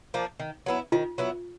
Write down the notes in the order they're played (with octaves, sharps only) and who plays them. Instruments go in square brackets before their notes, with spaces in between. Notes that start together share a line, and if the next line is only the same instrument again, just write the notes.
[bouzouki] F3 A#3 D4
D#3
F#3 B3 E4
[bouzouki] D#3 [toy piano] F4
[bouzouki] F#3 B3 E4